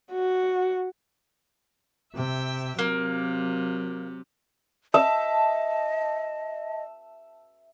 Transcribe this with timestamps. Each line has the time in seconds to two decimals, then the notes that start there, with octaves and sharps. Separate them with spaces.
0.12 F#4
2.14 C3 E5 G5
2.79 C3 F#3 A#3
4.94 D#5 E5 A5